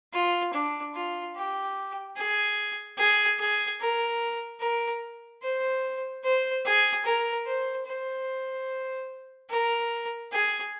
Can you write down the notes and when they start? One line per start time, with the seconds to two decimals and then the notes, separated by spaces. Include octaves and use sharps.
0.13 F4
0.53 D4
0.94 F4
1.35 G4
2.16 G#4
2.98 G#4
3.39 G#4
3.80 A#4
4.60 A#4
5.42 C5
6.24 C5
6.65 G#4
7.05 A#4
7.46 C5
7.86 C5
9.49 A#4
10.32 G#4